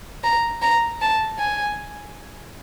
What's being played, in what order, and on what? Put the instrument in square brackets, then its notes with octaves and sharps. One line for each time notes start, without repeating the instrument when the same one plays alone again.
[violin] A#5
A#5
A5
G#5